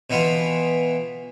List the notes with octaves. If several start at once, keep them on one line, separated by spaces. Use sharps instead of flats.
B2 E3 B3 F4